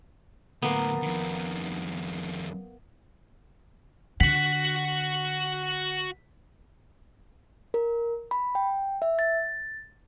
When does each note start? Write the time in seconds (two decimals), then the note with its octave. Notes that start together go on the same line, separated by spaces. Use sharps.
0.62 D2 A2 A#3 B3
1.02 F2 D#3
4.20 D3 F#4 F#5 B6
7.74 A#4
8.31 B5
8.55 G5
9.02 E5
9.19 A6